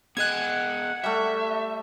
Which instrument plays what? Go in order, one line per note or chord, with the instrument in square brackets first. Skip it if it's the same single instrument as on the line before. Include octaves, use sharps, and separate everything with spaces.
[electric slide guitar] B3 G#4 D#5 [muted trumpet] F#5 [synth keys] F#6 G#6
[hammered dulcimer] G3 A3 [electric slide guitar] E5